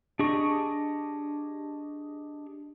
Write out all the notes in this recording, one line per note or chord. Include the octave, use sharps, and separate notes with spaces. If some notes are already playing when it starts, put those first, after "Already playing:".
D4 G4 G#4 D#5 C#6